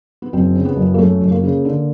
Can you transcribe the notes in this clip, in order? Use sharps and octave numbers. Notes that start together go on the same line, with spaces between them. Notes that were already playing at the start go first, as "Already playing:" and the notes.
B3
F#1 C4
C#3
B3
F#1
A#3
F#2 A3
F#1
A#3
C#3
D3